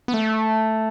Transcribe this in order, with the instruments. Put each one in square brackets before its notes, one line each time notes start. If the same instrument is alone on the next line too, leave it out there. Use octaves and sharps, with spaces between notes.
[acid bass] B3
A3